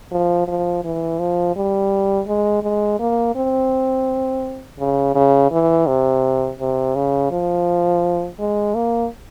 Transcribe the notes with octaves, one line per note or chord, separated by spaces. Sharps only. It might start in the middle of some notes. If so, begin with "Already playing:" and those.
F3
F3
E3
F3
G3
G#3
G#3
A#3
C4
C#3
C#3
E3
C3
C3
C#3
F3
G#3
A#3